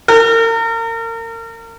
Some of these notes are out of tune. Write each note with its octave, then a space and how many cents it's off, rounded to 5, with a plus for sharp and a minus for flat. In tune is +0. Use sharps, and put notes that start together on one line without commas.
A#4 -35